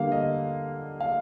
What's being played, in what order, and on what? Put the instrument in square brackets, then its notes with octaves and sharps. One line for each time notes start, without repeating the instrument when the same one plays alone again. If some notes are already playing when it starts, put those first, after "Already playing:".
Already playing: [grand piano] D3 G3 A#3 F5
D#5
F5